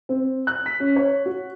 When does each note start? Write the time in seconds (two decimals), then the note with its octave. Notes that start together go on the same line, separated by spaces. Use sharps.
0.09 C4
0.47 F#6
0.66 B6
0.80 C#4
0.96 C#5
1.26 F#4